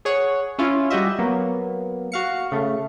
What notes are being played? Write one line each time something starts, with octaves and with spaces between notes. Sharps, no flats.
G#4 C#5 F#5
C#4 E4 F4
G3 F#4 G4 D#5 E5
F#3 A#3 B3
F#4 F5 C#7
C#3 A3